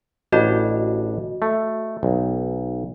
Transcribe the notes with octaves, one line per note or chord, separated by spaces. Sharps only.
A1 D4 F#4 D#5
A3
B1